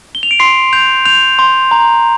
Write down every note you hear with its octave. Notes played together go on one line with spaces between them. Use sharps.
G7
F7
D7
C6 C7
G6 F7
G6 F7
C6
A#5